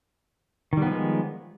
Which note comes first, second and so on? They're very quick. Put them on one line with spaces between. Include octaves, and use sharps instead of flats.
D#3 G3 B3 F3 G#3